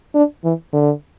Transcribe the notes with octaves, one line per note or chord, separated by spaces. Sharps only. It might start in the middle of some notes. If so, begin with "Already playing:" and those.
D4
E3
D3